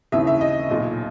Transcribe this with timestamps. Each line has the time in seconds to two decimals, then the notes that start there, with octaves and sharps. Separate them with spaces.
0.12 D#2 C#3 E3 E5
0.27 E5
0.41 D#5
0.70 B1 A#2